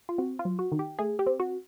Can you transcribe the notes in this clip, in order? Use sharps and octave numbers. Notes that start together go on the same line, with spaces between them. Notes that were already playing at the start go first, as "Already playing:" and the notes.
F4
C4 F#4
F4
F#3
F#4
D#3
G4
A3 G#4
G4
C4
F#4